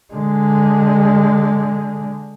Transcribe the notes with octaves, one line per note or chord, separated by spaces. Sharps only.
D3 G#3